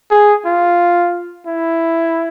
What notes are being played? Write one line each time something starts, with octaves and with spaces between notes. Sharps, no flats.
G#4
F4
E4